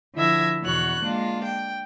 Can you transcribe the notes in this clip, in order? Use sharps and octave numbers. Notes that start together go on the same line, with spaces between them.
D3 F3 E4 E5 G#6 A#6
E2 B2 F#4 C#5 F#6
G#3 A#3 D4 F4
G5